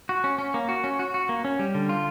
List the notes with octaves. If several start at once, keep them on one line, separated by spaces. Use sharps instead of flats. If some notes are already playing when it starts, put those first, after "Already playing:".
F#4
C#4
C#4
A#3
F#4
C#4
F#4
F#4
A#3
C#4
G3
D3
F4